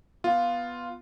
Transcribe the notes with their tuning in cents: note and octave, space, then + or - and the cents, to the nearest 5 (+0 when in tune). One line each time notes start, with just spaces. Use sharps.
B3 +0 F4 +0